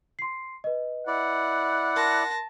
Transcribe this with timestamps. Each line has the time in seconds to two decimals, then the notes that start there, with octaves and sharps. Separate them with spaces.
0.19 C6 C7
0.64 B4 D#5
1.07 E4 D5 F#5
1.96 A#4 A5 C6 A#6